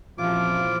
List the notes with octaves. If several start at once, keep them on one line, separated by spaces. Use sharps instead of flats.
A#1 F#2 C3 E3 F3 F4 D6